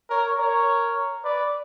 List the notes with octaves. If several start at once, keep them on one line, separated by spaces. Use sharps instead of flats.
A#4 C#5
A#4 C#5
B4 D5